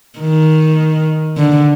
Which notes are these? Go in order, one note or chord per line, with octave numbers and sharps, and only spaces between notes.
D#3
D3